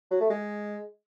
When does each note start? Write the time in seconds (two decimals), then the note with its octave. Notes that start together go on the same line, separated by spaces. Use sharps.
0.11 F#3
0.20 A3
0.30 G#3